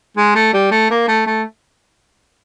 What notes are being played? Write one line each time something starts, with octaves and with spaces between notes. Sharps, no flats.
G#3
A3
G3
A3
A#3
A3
A3